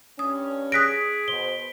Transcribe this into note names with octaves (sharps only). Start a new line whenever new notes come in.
G2 C#4 D#6
G#4 D#6 F#6 A#6 B6 D7
B2 C5 G7